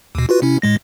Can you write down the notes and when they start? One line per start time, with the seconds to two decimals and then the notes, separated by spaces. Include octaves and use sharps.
0.15 D#2 B2
0.29 F4 F#4 B4
0.42 C3 C#4 E4
0.62 A2 G#3 A#6